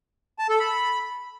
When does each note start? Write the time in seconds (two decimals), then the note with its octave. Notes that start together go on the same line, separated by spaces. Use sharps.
0.39 A5
0.49 A4
0.60 B5